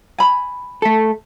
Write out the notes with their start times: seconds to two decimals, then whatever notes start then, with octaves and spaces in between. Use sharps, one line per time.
0.18 G#5 B5
0.82 A3 A4